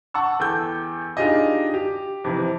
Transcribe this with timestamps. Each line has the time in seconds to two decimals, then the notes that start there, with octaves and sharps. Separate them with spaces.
0.14 F#5 A5 C#6 E6
0.39 E2 A4 G5 G6
1.17 D4 D#4 F4 G4 G#4 D#5
1.74 G4
2.24 F2 C3 E3